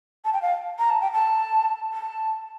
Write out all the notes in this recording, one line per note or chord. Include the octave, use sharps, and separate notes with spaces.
A5
G5
F5
A#5
A5
G5
A5
A5